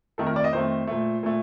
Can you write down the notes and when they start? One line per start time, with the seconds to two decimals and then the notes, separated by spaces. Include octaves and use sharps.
0.18 F2 D#3 A3 A4
0.26 A#4
0.36 D5
0.44 D#5
0.53 F2 D#3 A3 C5
0.87 A#2 A3
1.23 A#2 A3